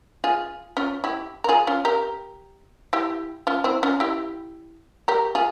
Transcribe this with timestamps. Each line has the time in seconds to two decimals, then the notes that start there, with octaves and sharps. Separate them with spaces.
0.24 F4 G#4
0.77 C#4 F4
1.04 E4 G4
1.44 A#4
1.49 F4 G#4
1.67 C#4 F4
1.85 G4 A#4
2.93 E4 G4
3.47 C#4 F4
3.64 C4 E4
3.83 C#4 F4
4.00 E4 G4
5.08 G4 A#4
5.35 F4 G#4